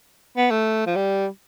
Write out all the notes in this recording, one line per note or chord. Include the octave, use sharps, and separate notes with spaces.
B3
A3
F3
G3